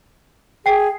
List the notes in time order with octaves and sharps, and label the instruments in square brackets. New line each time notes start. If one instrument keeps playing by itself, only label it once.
[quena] G#4 [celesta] G5 C7